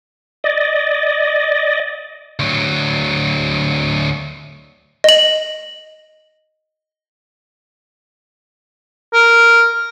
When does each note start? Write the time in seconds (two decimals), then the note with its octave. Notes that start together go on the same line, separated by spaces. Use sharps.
0.44 D5 D#5
2.39 D2 F#3
5.04 D#5 F#7
9.14 A#4